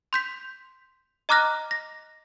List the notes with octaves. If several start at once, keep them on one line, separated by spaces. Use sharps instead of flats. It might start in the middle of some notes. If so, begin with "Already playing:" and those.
C6 G6 B6
D#5 A#5 D6 F6 F#6 A#6
A#6